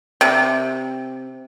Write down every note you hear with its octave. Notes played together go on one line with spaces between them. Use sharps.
C3